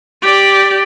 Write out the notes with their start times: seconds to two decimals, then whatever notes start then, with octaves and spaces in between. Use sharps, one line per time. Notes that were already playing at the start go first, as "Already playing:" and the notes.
0.22 G4 D5